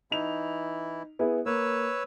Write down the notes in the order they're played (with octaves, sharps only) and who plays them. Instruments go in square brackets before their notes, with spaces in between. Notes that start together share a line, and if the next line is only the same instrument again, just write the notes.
[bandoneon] E3 E4 [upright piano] D#4 F7
[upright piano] B3 E4 G#4
[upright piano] A#3 [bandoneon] B4 C#5 E6